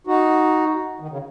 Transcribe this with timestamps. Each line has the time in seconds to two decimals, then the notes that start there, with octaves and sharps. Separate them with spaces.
0.07 D#4 F#4
1.00 D#3
1.11 C#3